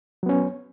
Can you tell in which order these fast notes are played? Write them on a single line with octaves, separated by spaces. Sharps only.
F#3 B3 C#4